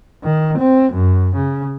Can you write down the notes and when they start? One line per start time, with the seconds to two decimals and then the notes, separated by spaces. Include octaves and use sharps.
0.23 D#3
0.58 C4
0.93 F#2
1.36 C#3